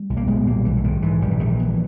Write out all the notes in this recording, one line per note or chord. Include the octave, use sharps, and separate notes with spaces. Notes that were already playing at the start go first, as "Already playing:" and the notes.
Already playing: G3
B1
A#3
A#2 G#3 B3
B1 G3 A#3
B1 E3
E3
G#2 D#3
G#2 E3
A#1 G3
E3
A#1 D#3
E3
A#1